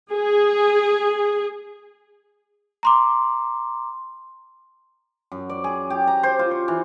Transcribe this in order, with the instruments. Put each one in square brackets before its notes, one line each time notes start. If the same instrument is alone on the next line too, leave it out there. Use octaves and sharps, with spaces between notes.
[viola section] G#4
[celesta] A#5 C6 D6
[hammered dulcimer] F#2
D5
G#4
G4
A#5
C5
F4
C#6
E3